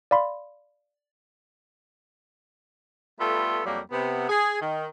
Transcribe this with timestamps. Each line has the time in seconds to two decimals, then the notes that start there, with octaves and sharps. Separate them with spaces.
0.11 D5 F5 B5 C6
3.19 G3 A3 B3 F4 A4
3.66 F2 F#3 G3 A#3
3.91 C3 B3
4.29 G#4
4.61 D#3